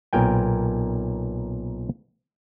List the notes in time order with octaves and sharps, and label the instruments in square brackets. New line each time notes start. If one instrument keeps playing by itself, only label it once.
[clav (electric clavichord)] B1 A#2 A#4 G5 G#5